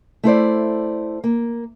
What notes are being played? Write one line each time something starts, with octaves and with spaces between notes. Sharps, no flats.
A3 E4 C5 D5
A#3